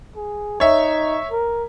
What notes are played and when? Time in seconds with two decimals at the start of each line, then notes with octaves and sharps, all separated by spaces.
0.16 G#4
0.60 D#4 C#5 E5
1.31 A#4